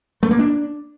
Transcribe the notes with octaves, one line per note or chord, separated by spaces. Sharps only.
A3
A#3
D4